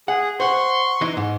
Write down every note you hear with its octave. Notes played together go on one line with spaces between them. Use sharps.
G#4 F#5
C5 F#5 C6 C#6
E3 D#4
G#2